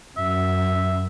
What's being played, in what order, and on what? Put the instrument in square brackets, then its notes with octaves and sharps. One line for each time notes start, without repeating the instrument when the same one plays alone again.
[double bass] F#2 [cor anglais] E5